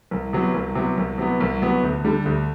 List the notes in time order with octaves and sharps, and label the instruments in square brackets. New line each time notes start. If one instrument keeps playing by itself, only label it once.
[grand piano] C2
C3 F#3 B3
C2
C3 F#3 B3
C2
C3 F#3 B3
C2
C3 F#3 B3
D2
D3 G3
D2